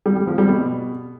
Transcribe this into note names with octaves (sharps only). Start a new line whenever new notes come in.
G3
G3
F3
G3
B2